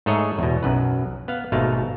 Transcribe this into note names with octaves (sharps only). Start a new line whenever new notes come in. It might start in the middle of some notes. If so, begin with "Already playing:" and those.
G#2 A3 G#4 A4 C#5 D#5
E2 B2
B1 F#2 B4
B3 F5
G#1 B2 A3 D#4 F5